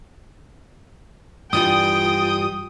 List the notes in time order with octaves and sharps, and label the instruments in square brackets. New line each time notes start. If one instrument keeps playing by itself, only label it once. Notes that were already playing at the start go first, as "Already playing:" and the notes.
[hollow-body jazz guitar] G2 E3 G3 [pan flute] F4 [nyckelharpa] G5 [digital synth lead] D#6